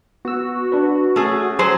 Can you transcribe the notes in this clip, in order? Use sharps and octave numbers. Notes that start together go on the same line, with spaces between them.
B3 F#4 E6
D4 B4
A3 C#4 G#4 D#6 F6
F#3 G#4 C5